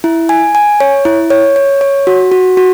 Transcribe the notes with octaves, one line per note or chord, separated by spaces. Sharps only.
E4
G#5
G#5
C#5
E4
C#5
C#5
C#5
F#4
F#4
F#4